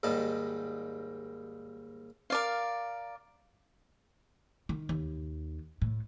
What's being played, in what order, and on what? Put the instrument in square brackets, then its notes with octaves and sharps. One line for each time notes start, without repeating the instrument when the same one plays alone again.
[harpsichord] D#2 G#2 G3 D#5 A5
[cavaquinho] A#4 D5 F5
[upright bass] D#3
D#2
A2